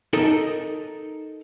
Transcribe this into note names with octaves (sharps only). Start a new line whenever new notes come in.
D#4 A4 A#4 D#5